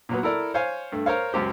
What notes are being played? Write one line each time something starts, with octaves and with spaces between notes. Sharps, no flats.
A#2 F#3 B3
E4 A4 A#4 D5
C5 C#5 F5 G#5
G2 A3
A#4 C5 C#5 F5
C#2 F#2 G4 C5